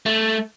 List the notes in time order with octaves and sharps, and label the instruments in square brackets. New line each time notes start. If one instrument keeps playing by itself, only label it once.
[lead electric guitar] A3